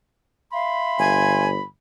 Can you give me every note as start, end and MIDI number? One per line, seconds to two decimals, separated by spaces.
0.52 1.44 76
0.52 1.44 77
0.52 1.67 83
0.52 1.44 84
0.99 1.59 31
0.99 1.49 80